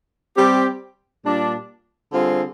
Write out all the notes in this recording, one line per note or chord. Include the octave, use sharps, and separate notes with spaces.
G3 C4 G4
A#2 G3 D4
D3 G3 C4 F4 G#4